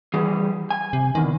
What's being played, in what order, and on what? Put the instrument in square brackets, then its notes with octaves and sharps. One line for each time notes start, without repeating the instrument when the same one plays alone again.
[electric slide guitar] E3 G3 G#4
G#5
[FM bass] C3
[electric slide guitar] E2 [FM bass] D#3